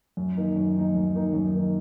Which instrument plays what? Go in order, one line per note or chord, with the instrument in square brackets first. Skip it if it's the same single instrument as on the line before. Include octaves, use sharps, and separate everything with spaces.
[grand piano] F#2
D#3 A#3 D#4
F#2
D#3 A#3 D#4
F#2
D#3 A#3 D#4
F#2
D#3 A#3 D#4